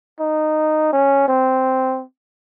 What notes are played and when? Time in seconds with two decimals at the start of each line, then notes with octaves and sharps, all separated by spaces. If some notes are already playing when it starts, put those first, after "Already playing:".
0.20 D#4
0.93 C#4
1.28 C4